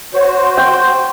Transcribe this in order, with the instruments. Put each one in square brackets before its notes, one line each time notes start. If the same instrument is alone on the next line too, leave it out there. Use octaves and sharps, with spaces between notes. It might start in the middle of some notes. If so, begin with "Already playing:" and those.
[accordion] F#4 C5 [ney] C#5
[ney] C6
[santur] G5 [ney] C6